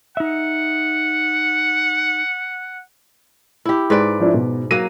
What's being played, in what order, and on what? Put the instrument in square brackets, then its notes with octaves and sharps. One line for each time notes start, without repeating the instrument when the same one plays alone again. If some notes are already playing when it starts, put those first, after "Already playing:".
[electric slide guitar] D#4 E5 [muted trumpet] F#5
[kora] E4 G4
G#2 B4 D5
[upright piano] F3 D4 E4
B2
[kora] F#3 A#3 [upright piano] D#7